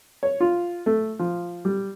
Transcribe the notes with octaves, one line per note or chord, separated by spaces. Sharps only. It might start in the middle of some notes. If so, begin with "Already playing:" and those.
C#5
F4
A3
F3
G3